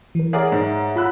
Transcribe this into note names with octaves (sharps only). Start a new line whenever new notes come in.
E3 A#4
G#4 A#4 C#5 D5 E5 F#5
G#2
F4 F#5 A#5 B5 E6 F#6